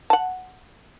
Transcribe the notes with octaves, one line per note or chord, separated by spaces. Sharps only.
F#5 A5